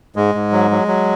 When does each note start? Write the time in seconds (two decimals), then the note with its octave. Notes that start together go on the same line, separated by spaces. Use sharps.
0.16 G#2 G#3
0.35 G#2
0.53 F#3
0.71 F#3
0.88 F#3